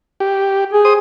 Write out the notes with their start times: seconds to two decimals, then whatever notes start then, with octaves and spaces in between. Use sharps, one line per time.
0.20 G4
0.73 G#4
0.85 C5 D#6